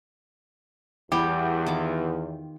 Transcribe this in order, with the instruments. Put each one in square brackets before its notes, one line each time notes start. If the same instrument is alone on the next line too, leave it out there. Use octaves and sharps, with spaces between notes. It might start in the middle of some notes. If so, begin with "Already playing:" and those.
[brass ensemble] E2 [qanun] E3 G3 B3 [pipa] G4
[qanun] D#3 F4 D6